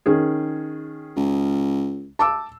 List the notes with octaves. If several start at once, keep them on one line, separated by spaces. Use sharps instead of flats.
D#3 C#4 G#4
C#2
A5 D6 E6